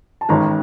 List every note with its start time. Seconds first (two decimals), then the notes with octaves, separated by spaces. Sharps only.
0.21 A5
0.29 A1 G#2 D#3 A#5